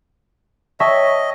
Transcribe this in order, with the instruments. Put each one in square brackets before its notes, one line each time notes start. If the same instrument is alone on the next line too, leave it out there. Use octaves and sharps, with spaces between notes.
[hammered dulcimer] C#5 [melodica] D#5 [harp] E5 [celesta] G5 A5 C#6